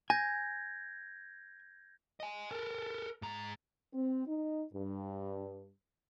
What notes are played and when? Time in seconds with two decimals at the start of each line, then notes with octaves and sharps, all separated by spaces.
0.10 G#5 G6 G#6 A#6
2.20 D#5 G#5
2.51 A4 A#4
3.22 G#2 A#5
3.94 C4
4.27 D#4
4.73 G2